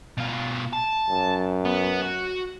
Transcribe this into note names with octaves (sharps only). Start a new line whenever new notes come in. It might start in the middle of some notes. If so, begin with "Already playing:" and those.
B2 F4
A5
F#2
B3
F#4